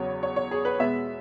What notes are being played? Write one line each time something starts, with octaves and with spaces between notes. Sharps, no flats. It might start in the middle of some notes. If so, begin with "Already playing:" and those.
Already playing: E2 C#3 F#3 B3 C#5
C#5
C#5
G#4
B4
B2 G#3 B3 E5